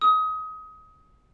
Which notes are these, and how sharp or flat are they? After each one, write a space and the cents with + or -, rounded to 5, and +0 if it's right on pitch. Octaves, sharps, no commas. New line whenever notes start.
D#6 +25